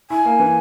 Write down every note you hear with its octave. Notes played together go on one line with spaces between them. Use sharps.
E4 G#5
A#3
E3